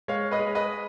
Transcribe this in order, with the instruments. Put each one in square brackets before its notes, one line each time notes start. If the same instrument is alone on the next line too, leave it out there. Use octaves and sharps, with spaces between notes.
[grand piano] G#3 C#5 F5
B4 D#5
G#3
B4 D#5